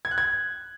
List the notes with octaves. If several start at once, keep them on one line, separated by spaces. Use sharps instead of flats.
G#6
F#6
G#6